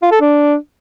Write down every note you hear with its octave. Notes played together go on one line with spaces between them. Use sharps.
F4
A4
D4